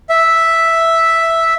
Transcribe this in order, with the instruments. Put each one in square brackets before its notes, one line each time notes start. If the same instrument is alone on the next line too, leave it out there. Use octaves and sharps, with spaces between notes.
[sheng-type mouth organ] E5